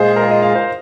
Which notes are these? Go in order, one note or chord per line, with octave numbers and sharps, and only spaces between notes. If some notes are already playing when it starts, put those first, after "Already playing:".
Already playing: A#2 G#3 F4 G#4 C5
A#4
C5
D#5
F5
C5